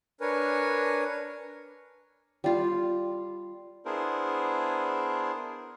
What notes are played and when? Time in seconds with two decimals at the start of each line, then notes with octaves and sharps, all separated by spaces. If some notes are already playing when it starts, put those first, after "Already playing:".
0.21 D4 A#4 B4 C#5 G#5
2.44 G3 F4
3.85 B3 D4 E4 G#4 A#4 C5